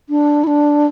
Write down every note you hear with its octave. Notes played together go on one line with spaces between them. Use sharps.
D4
E4
D4